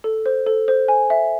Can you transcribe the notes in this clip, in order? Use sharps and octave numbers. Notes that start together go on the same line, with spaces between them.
A4
C5
A4
C5
G#5
E5